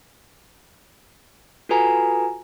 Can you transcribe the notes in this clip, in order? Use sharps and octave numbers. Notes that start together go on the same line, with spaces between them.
F4 F#4 A4 B4 G#5 A#5